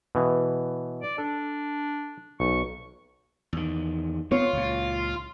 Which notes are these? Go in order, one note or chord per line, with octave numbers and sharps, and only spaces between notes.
B2 E3
D5
D4 A4
B1 C#6
E2 D#3
B3 C4 F4 C#5
C#2 A#2